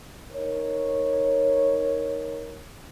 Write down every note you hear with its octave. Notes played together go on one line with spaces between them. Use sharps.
D#4 A#4 C#5